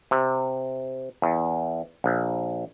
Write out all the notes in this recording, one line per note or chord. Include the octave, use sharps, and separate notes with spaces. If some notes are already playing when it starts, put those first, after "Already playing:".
C3
E2
A#1